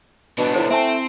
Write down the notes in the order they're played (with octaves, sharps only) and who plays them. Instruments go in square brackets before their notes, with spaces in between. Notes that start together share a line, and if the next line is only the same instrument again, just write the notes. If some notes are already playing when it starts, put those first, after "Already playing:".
[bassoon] B2 [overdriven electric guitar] B3 D4
[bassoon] A2 [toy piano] E4 C5
[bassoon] A3 [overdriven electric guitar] C4 [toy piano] E5 G#5 A5